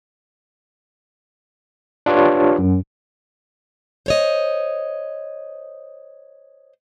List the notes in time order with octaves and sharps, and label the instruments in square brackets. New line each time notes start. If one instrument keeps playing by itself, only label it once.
[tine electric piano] D4 F4 G4 B4 C#5
F#2
[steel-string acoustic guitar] C5 C#5 D#5